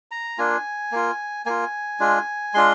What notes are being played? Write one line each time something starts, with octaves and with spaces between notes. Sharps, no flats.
A#5
A#3 D4 F4 G#5
A#3 F4
A#3 F4 G#5
G#3 D4 F4
G#3 D4 F4 C6